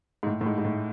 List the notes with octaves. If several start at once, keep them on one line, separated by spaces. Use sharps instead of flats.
G#2
A2
A2
G#2
G#2
A2